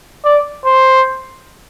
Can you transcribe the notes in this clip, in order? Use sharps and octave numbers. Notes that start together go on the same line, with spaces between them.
D5
C5